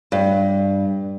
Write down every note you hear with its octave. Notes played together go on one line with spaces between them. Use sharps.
G2